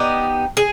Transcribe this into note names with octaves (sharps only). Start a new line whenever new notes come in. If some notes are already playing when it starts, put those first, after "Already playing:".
Already playing: B3 D#4 G4
G#4